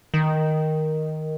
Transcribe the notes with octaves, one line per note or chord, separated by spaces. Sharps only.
D#3